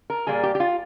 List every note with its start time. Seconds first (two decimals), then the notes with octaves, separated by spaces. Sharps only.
0.10 A#4
0.27 A#2 G3 A#3 G#4
0.43 G4
0.55 G4
0.60 F4